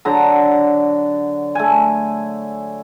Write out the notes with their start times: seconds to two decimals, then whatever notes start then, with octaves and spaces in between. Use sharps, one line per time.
0.05 D3 F#3 A#5
1.55 A3 G#5